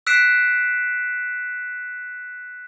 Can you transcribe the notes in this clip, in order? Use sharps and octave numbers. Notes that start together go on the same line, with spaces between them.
E6 F#6 B6 C7 D7 E7